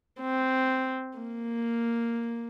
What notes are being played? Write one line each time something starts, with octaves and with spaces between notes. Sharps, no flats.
C4
A#3